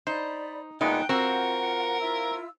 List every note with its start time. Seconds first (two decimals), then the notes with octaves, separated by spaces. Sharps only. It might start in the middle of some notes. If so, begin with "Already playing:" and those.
0.07 D#4 C5 D5 B5
0.81 A#2 G#3 B3 D#4 F#5 G5 A5 F#6
1.09 C4 F4 F#4 A#4 F#5
2.00 E4 F4 E6